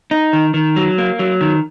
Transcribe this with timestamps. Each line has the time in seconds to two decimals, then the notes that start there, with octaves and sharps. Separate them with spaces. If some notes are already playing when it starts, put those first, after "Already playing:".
0.11 D#4
0.33 D#3
0.54 D#3
0.76 F#3
0.98 A#3
1.19 F#3
1.41 D#3